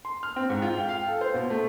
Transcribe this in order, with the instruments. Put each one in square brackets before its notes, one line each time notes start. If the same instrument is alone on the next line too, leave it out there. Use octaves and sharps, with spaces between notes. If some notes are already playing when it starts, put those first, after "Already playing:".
[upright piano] C6
F6
C4
G#2
F4
G5
F5
A4
C5
B2
A3